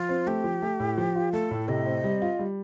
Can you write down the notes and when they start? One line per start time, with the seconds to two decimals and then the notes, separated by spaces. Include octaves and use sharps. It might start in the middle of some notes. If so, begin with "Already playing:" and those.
Already playing: F3 F4
0.09 C4
0.27 A3 G4
0.44 F3
0.62 A3
0.80 A2
0.98 F3
1.15 F4
1.32 A3 A4
1.51 A2
1.68 C3 D#5
1.86 C4
2.04 G3
2.22 F4
2.39 G3